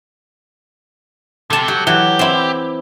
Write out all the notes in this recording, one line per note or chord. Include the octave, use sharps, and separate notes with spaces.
C3 G4 A4 A5
F#3 G4
E3 F#3 G4
C4 E4